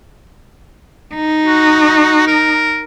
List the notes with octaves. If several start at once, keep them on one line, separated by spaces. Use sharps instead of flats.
D#4
F#4
A#4